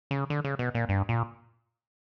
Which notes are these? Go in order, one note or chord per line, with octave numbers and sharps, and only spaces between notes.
C#3
D3
C#3
B2
A#2
G2
A#2